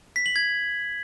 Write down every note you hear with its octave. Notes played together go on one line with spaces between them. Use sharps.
B6
F#7
G#6